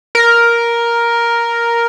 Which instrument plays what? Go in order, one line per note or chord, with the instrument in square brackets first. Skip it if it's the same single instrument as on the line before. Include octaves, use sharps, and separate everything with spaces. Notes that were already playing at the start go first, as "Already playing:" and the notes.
[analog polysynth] A#4